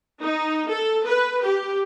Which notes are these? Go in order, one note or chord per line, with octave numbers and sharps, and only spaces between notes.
D#4
A4
B4
G4